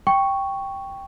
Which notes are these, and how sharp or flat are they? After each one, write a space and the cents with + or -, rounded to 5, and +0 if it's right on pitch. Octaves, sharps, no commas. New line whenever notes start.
G5 +0 C#6 +0